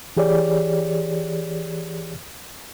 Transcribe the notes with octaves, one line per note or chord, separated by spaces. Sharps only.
E3 G4 G#4 C#5 D5